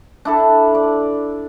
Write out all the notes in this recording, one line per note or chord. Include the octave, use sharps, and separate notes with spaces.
D4 E4 A4
D5